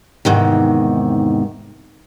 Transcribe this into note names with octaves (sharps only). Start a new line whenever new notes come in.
E2 G#2 C3 D#3